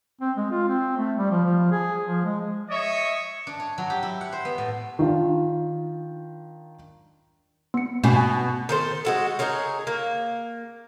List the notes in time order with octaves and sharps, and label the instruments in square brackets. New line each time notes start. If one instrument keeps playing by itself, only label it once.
[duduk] C4
G#3
F4
C4
A3
G3
F3
F3
G#4
F3
G#3
[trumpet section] C#5 D#5 E5
[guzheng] D4
C#5
F#3
G4
E4
F#5
C5
B3
A2
[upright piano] D#3 D4 F4
[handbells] B3 C#7
[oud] B2 [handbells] A3 C#4
[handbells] G#5
[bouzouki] D#3 A4 C5
G#3 F#4 A4
D#4 G#4 A#4 C#5
A#3